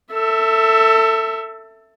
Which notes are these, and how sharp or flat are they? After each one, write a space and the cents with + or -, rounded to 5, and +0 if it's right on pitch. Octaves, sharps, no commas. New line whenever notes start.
A4 +25 E5 +0